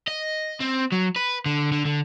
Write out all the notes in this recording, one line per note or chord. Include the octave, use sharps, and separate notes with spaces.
D#5
C4
F#3
B4
D3
D3
D3